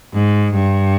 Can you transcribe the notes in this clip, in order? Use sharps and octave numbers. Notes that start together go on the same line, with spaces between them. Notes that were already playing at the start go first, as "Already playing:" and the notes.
G#2
G2